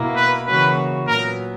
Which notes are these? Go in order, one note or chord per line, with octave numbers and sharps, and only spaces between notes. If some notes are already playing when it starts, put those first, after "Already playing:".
Already playing: B2 A#3 E4
B4
C#3 E3 A#3 C#4 F#4 B4
A#2 F#3 B3 A#4